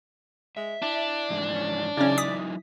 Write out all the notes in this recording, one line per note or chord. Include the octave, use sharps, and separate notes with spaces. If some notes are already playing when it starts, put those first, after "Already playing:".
G#3 E5
D4 E4
F2 G#2 E3
C#4
C#3 F#3 C#4 D#4 E4 D5
D#6 B6